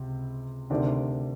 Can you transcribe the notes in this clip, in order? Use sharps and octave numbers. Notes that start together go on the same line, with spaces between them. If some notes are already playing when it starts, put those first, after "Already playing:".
Already playing: C#2 C3
D2 C3 D#3 D4 D5